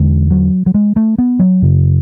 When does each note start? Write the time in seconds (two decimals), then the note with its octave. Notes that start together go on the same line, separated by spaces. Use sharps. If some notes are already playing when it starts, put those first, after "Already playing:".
Already playing: E2 D3 G#3
0.31 F#3
0.66 F#3
0.74 G#3
0.96 A3
1.18 B3
1.39 F#3
1.62 F#2 C#3